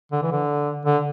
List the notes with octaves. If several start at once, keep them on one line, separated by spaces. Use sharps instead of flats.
D3
E3
D3
D3